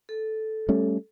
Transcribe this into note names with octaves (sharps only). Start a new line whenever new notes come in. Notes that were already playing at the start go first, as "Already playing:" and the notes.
A4
G3 A3 C#4